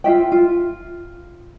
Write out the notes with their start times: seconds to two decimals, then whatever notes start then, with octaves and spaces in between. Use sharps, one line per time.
0.04 F4 E5 G5
0.32 F4